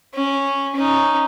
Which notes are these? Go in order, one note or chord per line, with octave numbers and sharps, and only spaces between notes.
C#4
C#4 D#4